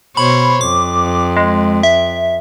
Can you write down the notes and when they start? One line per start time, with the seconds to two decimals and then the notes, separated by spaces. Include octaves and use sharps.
0.17 B2 C5 C#5 B5
0.61 F2 D6
1.37 G#3
1.83 E5